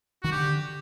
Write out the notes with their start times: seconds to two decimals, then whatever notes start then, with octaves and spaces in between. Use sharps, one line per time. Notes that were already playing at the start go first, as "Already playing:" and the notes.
0.23 D#3 F#4
0.32 D3 G4